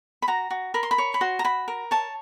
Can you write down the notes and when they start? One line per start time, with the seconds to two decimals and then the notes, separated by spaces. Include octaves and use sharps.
0.22 B5
0.28 F#4 A#5
0.50 F#4
0.74 A#4 B5
0.83 C6
0.91 B5
0.98 C#5
1.14 B5
1.21 F#4 C6
1.39 A#5
1.44 F#4 B5
1.68 A#4
1.91 C#5 A5